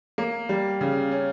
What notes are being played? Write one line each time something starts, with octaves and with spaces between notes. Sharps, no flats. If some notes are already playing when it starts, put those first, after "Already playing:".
A#3
G3
C#3
C#4